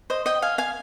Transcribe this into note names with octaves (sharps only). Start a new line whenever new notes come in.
C5 D#5
D#5 G5
F5 G#5
F5 G#5